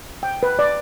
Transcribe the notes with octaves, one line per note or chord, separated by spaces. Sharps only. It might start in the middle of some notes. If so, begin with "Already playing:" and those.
G5
B4
D5